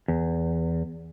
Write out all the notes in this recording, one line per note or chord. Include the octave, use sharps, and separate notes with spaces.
E2